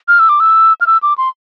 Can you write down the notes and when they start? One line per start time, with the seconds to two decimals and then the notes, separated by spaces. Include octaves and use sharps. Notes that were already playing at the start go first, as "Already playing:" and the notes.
0.08 F6
0.19 E6
0.29 D6
0.40 E6
0.81 F6
0.87 E6
1.03 D6
1.18 C6